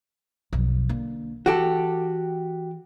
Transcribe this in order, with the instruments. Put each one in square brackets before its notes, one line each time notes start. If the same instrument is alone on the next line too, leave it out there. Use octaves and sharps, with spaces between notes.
[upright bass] B1 F2
D3 A#3
[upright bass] E3 [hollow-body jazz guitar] F#4 G4 A4